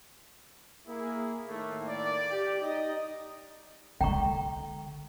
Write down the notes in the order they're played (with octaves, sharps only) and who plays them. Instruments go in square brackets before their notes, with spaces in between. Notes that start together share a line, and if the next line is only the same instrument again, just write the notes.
[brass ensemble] A#3 G#4 [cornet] E4
[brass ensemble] A2 D#3 A#3 [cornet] A3
[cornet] D5
[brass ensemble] G4
D#4 D#5
[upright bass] D3 G#3 [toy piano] G5 A#5 C#6